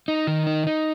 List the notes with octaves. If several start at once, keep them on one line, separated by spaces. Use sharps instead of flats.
D#4
D#3
D#4
D#4